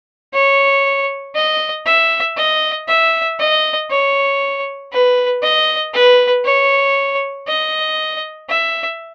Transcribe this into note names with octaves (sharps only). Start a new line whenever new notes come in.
C#5
D#5
E5
D#5
E5
D#5
C#5
B4
D#5
B4
C#5
D#5
E5